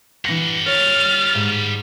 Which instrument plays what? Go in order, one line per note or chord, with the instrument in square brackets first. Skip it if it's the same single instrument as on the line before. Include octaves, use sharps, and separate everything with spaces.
[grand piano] E3 A#6 [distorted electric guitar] G3 F#5
[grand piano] C#5 [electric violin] F6 A6
[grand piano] G#2